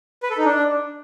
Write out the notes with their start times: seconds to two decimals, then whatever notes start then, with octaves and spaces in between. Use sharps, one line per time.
0.23 B4
0.30 A4
0.38 D#4
0.45 D4